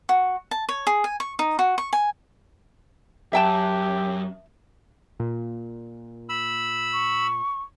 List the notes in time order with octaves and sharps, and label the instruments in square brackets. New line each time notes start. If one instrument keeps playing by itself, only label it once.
[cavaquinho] F#4
A5
C#5
G#4
G#5
C#6
D#4
F#4
C#6
G#5
[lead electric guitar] F#2 [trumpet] G4 [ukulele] E5 G5 A5
[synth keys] A#2
[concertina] B5 E6
[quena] C#6